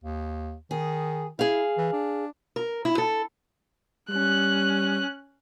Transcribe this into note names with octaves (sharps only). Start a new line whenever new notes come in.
D#2
D#3 G#4
E4 G#4 F5
E3
D4
A#4
E4
A4
G3 C#4 F#6